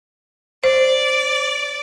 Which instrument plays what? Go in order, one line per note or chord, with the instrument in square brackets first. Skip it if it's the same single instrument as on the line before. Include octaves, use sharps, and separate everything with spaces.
[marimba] C5 [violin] D5